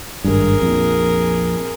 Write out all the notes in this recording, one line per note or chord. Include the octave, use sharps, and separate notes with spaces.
G#1 G2 G#4 A#4
A#1 F2